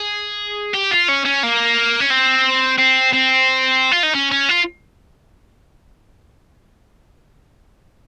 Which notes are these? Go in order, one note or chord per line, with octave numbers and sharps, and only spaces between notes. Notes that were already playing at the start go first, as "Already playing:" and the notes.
Already playing: G#4
G4
F4
C#4
C#4
A#3
C#4
C4
C4
C4
F4
D#4
C#4
C#4
F4